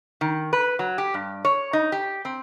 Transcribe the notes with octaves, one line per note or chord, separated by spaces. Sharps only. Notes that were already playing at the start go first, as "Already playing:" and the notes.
D#3
B4
F#3
G4
G2
C#5
D#4
G4
C4